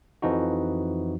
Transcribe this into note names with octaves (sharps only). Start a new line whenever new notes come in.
F2 E3 F3 D#4 F#4